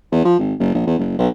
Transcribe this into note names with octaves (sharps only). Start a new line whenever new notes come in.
E2
F3
G#1
F#1
A#1
E2
F#1
B1